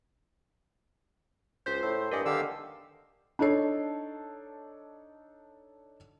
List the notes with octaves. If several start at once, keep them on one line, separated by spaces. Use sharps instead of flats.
C#2 C5 G6 B6
A2 E6
G2 A#4 D5 D#5 G#5
D3 D#3 G4 F5 E6
D4 D#4 A4 C#5 C7